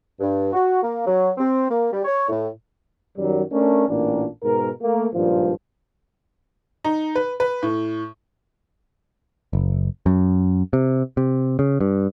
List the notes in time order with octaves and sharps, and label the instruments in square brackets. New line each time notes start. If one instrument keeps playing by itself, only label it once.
[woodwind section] G2
F#4
A#3
F#3
C4
A#3
G3
C#5
A2
[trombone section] F#2 D#3 F#3 G3
A3 C#4 D4 A#4
A1 A#2 A#3 D4
G#2 B2 A#4
A3 A#3
G#1 G2 A#2 F3
[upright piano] D#4
B4
B4
A2
[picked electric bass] F#1
F#2
C3
C3
C#3
G2